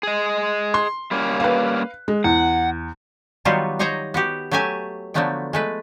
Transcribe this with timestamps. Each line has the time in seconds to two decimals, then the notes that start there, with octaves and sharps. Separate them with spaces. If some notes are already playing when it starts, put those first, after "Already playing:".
0.03 G#4 D#5
0.74 C6
1.11 G3 A#3 C#4
1.40 B4 F5
2.08 G#3
2.24 E2 F#5
3.45 D#3 F#3 G3 B3 F4 F#4
3.79 D#4 C5 C#5 D#5 A#5
4.14 B3 F#4 G4
4.51 F#3 A3 G4 E5 G#5
5.14 D3 F3 F#3 A3 B3 G5
5.53 G#3 A3 B4